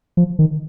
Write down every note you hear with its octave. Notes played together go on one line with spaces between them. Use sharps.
F3
D#3